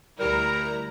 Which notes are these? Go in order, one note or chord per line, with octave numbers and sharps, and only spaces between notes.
D2 G3 E4 A#4 A#5